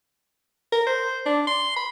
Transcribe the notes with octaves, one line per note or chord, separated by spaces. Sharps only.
A#4
C5
D4
C6
B5